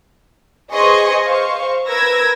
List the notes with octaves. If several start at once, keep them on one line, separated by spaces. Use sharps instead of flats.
G#4 B4 C5 D#5 C6 C#6
C5 F5 C#6
A#4 B4 E6 G#6 A#6